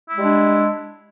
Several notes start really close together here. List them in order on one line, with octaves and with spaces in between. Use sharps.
E4 G#3 G3 D4